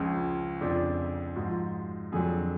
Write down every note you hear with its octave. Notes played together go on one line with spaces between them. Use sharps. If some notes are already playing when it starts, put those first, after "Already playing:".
Already playing: C#2 C#3 F3 C#4
F2 C#3 F3 D4
G#2 F3 F#4
F2 D3 F#3 G#4